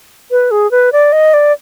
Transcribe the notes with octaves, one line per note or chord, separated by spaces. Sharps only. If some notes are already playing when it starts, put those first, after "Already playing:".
B4
G#4
B4
D5
D#5
D5